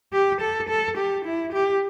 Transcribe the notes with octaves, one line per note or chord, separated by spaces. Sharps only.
G4
A4
A4
G4
E4
G4